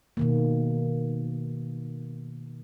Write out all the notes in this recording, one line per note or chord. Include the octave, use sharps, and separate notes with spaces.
B2 D#3 A#3